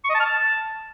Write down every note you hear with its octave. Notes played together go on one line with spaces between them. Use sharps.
C#6
D#5
A5
F6
A5